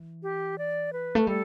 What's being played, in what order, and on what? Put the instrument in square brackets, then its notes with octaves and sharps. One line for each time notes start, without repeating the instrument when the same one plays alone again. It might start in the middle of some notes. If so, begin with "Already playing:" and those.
Already playing: [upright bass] E3
[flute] G4
D5
B4
[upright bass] A3
[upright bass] G3 [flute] A4